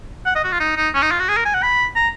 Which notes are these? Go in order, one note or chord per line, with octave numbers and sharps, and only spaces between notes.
F#5
D#5
F#4
F4
D#4
D#4
C#4
D#4
F4
F#4
G#4
A#4
G#5
F#5
B5
A#5